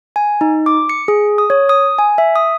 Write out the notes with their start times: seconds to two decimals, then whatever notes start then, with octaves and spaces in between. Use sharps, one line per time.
0.16 G#5
0.41 D#4
0.66 D6
0.89 C#7
1.08 G#4
1.38 D#6
1.50 C#5
1.69 D#6
1.98 G#5
2.18 E5
2.36 D#6